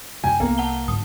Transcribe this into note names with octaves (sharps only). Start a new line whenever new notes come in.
F#2 C3 G#3 G5 G#5
C2 A#3 B3
F#5 A5 G7
G#2 D3 F#3 D#6